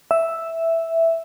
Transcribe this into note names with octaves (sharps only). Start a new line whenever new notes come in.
E5